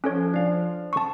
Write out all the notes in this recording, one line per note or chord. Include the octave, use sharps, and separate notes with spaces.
F3 C#4 A4 C#5
D4 F5
A5 C#6